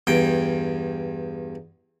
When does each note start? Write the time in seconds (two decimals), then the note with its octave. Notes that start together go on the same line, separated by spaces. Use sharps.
0.07 E2 G2 G5